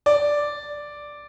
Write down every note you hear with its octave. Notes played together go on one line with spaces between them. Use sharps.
D5